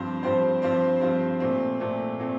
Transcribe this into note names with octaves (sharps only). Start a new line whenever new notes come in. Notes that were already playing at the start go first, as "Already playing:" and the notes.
Already playing: G2 F3 C4 G4 C5
G2 F3 C4 G4 C5
G2 F3 C4 G4 C5
G2 F3 C4 G4 C5
A#2 A3 C4
A#2 A3 C4
A#2 A3 C4